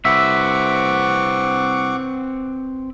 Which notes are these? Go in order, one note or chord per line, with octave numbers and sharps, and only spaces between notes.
C2 C4 B4 E5 F#5 C#6 D6